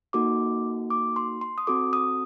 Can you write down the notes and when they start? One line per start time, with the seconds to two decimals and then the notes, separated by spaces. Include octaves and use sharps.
0.13 A#3 D#4 F#4 A4 D6
0.90 D6
1.16 C6
1.41 C6
1.58 D#6
1.67 C4 F#4 A4 D6
1.93 D#6